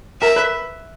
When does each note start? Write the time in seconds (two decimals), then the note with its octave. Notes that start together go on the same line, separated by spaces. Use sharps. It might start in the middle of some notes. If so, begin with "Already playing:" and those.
0.21 A#4 E5
0.36 B4